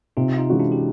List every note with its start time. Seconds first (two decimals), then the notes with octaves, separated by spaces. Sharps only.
0.17 C3 D#4 F4
0.38 D#4 F4
0.50 E3 G#3 C#4 F#4
0.59 D4 E4
0.72 G4